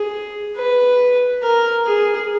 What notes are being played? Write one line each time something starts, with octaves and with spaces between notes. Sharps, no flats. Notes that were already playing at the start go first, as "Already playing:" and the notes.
Already playing: G#4
B4
A#4
G#4